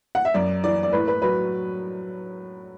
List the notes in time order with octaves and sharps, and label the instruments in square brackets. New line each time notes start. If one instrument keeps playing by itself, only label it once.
[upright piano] F#5
E5
F#2 D5
E3 D5
D5
A2 B4
B4
F#3 B4